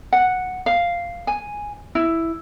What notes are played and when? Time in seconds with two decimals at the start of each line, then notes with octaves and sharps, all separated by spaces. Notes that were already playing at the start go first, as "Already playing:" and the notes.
0.13 F#5
0.66 F5
1.27 G#5
1.95 E4